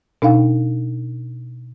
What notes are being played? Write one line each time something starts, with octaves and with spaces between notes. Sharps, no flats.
B2 D4 D#4 F5 G5